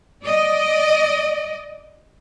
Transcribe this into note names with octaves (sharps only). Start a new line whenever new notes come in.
D5 D#5